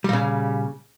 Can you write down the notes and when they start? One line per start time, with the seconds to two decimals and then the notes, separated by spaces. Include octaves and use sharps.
0.04 G3
0.09 A#2
0.13 C#3